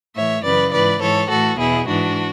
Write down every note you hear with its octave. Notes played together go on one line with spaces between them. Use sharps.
A2 E3 C#5 E5
F#2 C#3 E3 B4 D5
G#2 E3 B4 D5
G#2 E3 A4 C#5
A2 E3 F#4 A4
E2 B2 E4 G#4
G#2 E3 D4 F#4